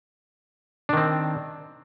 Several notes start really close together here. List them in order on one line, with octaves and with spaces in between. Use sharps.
D4 D#3 C4